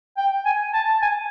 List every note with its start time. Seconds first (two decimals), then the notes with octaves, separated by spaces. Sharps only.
0.17 G5
0.46 G#5
0.73 A5
1.02 G#5